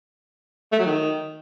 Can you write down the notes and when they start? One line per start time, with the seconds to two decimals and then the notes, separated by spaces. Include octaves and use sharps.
0.72 A3
0.79 F#3
0.86 D#3